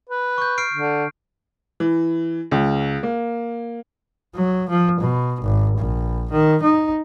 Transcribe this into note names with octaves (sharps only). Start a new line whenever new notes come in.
B4
C#6 G6
F6 C7 D7
D3
E3
C#2
A#3
F#3
F3
B2
G#1
A#1
D#3
D#4